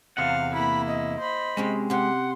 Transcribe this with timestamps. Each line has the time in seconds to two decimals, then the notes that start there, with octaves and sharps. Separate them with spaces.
0.17 E2 C3 F5 F#5
0.54 A#3 E4 B5
0.88 D#5
1.19 C5 B5
1.57 C3 G#3 C4 C#4
1.90 C3 G4 F#5 C6